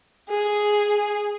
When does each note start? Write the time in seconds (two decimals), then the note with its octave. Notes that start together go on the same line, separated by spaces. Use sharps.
0.30 G#4